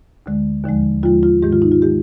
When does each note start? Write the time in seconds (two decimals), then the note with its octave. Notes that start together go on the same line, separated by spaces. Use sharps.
0.26 D2 D3 G#3
0.64 D#2 D3 F3 G#3
1.03 D#2 D3 F3 G#3 F4
1.23 F4
1.42 G#2 D#3 G#3 G4
1.53 F4
1.62 D#4
1.72 F4
1.82 D#3 G#3 G4